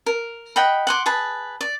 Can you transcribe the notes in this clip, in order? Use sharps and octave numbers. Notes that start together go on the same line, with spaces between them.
A#4
D#5 F#5 G5 B5
F#5 C6 D6
G#4 B4 A5 B5
D5